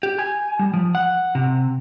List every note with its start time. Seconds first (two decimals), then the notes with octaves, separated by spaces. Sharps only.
0.03 G4
0.19 G#5
0.59 G3
0.74 F3
0.95 F#5
1.35 C3